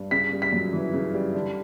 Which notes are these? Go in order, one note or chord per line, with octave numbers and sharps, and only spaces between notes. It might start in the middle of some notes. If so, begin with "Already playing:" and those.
Already playing: G2
C#3 B6
G3
B6
F#2
E3
C#3
G3
D3